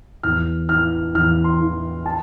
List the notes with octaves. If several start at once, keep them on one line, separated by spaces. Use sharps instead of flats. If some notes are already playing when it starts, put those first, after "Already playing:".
E2 F6
E3 F6
E2 F6
C6
E3
A5